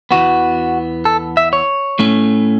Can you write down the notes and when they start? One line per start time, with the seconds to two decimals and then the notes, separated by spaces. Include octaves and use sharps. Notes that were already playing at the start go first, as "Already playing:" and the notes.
0.11 E2 E3 B3 F#4
1.05 A4
1.37 E5
1.53 C#5
1.99 A2 A3 C#4